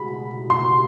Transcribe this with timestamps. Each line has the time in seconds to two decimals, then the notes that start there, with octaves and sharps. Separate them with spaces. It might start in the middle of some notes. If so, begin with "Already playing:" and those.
Already playing: B2 G#3 B5
0.50 C6